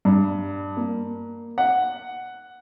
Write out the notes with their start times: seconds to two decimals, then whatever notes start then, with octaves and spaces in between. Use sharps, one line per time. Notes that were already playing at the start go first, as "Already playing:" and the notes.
0.05 G2
0.77 A#3
1.58 F#5